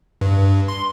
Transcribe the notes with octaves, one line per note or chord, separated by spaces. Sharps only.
G2
C6